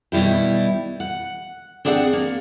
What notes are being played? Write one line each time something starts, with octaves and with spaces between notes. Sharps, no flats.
B2 D#3 G3 E4 G4
F#5
C4 D4 G#4 D5 F#5
A#3